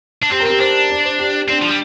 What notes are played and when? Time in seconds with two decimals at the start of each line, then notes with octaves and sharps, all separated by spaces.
0.22 D4
0.31 C4 G4
0.40 A#4
0.46 C4 G4
0.60 D4 C5
0.90 D5
1.05 C5
1.19 G4
1.48 C4 D4
1.62 F3
1.69 G3